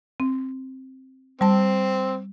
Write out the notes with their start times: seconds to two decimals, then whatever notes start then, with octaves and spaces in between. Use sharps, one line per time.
0.20 C4
1.41 G3 C4 A5